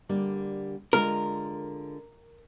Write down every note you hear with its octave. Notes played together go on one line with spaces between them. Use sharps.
D3 G3 A#3
D3 G#3 F4 A#4